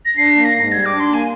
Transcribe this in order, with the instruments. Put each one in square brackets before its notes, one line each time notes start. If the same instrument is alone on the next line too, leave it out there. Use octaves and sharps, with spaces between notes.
[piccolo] A#6
[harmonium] D4 [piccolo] C7
[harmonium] A#3
[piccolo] A#6
[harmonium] G#2
[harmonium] G3 [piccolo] G#6
[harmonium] D4 [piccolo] D6
[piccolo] C6
[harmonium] A#3 [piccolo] G#5